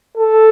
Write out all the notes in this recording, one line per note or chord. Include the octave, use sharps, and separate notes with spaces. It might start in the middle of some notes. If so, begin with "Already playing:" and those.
A4